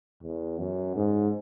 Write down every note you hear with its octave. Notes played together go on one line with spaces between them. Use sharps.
E2
F#2
G#2